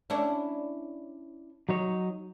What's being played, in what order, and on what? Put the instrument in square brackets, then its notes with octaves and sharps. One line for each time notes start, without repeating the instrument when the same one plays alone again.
[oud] C#4 D4 E4
[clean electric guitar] F#3 D#4 C#5